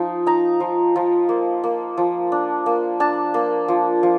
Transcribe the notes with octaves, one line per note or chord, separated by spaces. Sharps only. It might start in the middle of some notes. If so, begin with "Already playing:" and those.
Already playing: F3 D#4
D#4 A#5
F3
F3
A#3
A#3
F3
D4
A#3
D4 A5
A#3
F3
F3